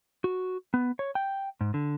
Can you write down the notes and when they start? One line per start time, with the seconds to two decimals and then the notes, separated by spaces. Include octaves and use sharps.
0.24 F#4
0.74 B3
0.99 C#5
1.15 G5
1.61 G#2
1.74 D3